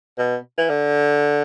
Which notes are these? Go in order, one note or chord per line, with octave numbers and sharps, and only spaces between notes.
B2
E3
D3